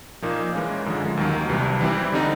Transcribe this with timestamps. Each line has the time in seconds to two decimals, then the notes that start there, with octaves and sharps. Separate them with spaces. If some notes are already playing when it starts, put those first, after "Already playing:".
0.22 A#2 F3 A#3 D#4
0.54 E3 G#3 C#4
0.86 F#2 D3 F3 G#3
1.17 D#2 D#3 F#3
1.49 C2 C3 E3 G3
1.81 E3 G3 C4 E4 G4
2.12 D3 G3 C4 D#4